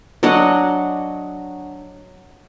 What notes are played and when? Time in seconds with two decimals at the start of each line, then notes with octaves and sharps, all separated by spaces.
0.23 F#3 D4 D#5 F#5